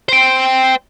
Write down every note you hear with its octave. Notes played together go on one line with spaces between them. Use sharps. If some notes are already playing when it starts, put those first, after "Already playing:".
C5 G5